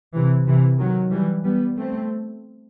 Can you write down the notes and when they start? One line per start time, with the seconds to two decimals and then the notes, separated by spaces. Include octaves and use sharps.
0.14 C3 E3
0.47 C3 E3
0.79 D#3 F#3
1.12 E3 G3
1.44 G3 B3
1.78 A3 C4